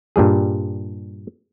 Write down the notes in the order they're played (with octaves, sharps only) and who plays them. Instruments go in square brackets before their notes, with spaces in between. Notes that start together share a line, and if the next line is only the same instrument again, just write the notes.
[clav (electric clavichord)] G2 A#2 G3 G#4